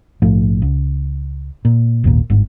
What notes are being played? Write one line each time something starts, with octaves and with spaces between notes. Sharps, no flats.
A#1 G#2 F3 A3
C#2
A#2
G#1 D#2 A#2
G1 G#2